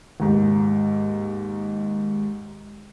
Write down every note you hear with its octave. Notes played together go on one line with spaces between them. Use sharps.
D#2 G#2